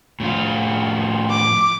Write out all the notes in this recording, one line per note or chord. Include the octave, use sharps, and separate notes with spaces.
A2 F3 F4
D6